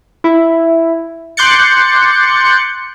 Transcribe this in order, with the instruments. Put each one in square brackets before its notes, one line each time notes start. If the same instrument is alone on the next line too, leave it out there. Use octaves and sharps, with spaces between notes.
[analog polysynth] E4
C6 D6 F#6 G6 A6 C#7